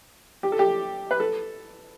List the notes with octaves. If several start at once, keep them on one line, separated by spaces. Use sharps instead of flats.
G4
A4
G4
B4
A4